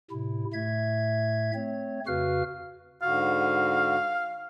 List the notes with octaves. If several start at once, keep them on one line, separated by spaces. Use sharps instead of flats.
A2 C3 E4
A2 A3 E5 G#6
A3 C4 C#5
F2 C#3 F#4 B4 F5 F6
G#2 D3 F#4 F5